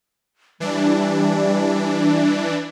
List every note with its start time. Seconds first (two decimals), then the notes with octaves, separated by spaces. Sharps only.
0.60 E3 G3 D4